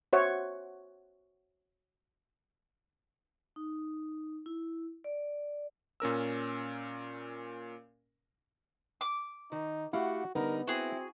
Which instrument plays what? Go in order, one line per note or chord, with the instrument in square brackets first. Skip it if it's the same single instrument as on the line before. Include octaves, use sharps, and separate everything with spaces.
[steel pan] F#4 C5 C#5 E5 F#5
[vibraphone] D#4
E4
D5
[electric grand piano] A#2 C#4 A#4 E6
[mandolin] D6
[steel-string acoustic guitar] D#3 [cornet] D#4
[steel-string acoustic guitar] A3 G4 F#5 [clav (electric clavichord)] E4 F5 [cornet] F#4
[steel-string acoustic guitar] D3 G3 D#4 [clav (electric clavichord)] B3 [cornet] A#4
[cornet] C4 [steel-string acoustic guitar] E4 [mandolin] F#4 G#4